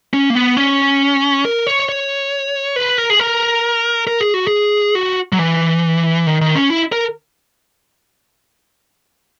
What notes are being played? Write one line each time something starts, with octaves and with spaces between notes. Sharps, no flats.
C#4
A#3
B3
C#4
A#4
C#5
C#5
B4
A#4
G#4
A#4
A#4
G#4
F#4
G#4
F#4
F#3
E3
D#3
D#3
C#4
E4
A#4